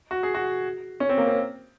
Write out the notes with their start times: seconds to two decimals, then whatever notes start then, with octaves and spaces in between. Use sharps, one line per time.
0.11 F#4
0.23 G#4
0.34 F#4
1.00 C#4
1.09 C4
1.17 A#3
1.27 C4